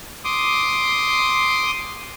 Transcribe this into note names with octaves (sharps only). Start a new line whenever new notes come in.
C6 D6 D#6